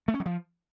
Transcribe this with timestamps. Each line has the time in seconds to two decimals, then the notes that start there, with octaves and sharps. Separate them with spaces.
0.08 A3
0.14 C#4
0.20 F#3
0.26 F3